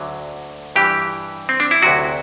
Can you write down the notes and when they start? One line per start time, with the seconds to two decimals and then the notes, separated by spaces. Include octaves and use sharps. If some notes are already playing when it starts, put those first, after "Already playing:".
Already playing: D2 D3 F#3
0.76 G2 E3 G4
1.49 C4
1.60 D4
1.71 E4
1.82 D2 C3 F#3 F#4